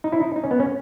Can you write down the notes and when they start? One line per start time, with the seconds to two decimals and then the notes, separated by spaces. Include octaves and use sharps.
0.04 D#4
0.12 E4
0.20 D#4
0.36 D#4
0.44 C#4
0.51 B3
0.60 C#4